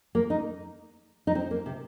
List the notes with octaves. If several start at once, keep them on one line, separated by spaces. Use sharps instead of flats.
A#3
D#4
D#4
C4
A#3
C3